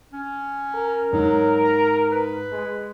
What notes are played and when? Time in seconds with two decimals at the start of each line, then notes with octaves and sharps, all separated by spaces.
0.13 C#4
0.75 A#4
1.13 G#2 F#3
1.64 A#5
2.12 B4
2.52 G#3